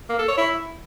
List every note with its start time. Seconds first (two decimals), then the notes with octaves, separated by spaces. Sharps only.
0.09 A#3
0.19 A4
0.28 C#5
0.37 E4